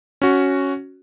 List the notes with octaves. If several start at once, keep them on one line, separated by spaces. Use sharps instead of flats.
C#4 F#4